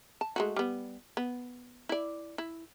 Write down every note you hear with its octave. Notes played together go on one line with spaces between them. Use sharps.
A5
G#3 A3 F#4
G3 B3
B3
E4 D5
E4